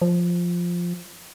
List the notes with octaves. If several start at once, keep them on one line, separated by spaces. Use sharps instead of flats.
F3